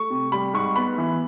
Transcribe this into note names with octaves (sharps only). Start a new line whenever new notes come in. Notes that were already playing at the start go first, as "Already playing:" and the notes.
Already playing: A3 C#6
C3
G3 B5
G#2 C#6
B3 B5
E3